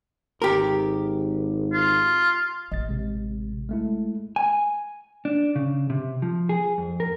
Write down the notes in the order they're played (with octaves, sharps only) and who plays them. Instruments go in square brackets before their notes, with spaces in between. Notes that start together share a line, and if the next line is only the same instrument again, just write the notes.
[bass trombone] G#1 [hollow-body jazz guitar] G4 A#4
[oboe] F4
[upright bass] A1 [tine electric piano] D#5 A6
[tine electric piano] C3 G#3
G#3 A3 E4
[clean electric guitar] G#5
D4
C#3
C3
F3
G#4
F2
A#4